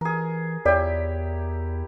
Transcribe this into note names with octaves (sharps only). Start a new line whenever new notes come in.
E3 G#4 A#4
E2 E4 G4 A#4 C#5 D5